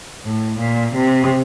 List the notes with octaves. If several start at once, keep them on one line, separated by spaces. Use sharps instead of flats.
A2
A#2
C3